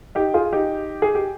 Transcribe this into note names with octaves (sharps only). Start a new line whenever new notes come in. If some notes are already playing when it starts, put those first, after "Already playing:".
D#4 G4
F4 G#4
D#4 G4
G#4
G4